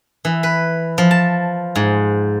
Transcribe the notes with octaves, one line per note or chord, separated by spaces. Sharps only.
E3
B4
F3
A5
G#2